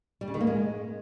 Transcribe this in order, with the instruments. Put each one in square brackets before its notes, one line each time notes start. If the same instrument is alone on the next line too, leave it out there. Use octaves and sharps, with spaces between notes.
[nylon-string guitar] G3
C#3
D#3
A#3
G#3